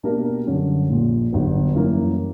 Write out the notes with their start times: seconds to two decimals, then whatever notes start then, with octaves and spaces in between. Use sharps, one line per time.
0.03 B2 A#3 D4 G4 A#4
0.46 F#2 D3 G3 C#4
0.89 A#1 A#2 A#3
1.33 G1 G2 F#3 B3
1.75 F#2 E3 G3 A#3